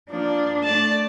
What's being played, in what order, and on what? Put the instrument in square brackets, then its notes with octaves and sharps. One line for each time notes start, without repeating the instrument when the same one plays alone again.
[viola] F3 A#3 [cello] D4
[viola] A3 [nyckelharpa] D5 A5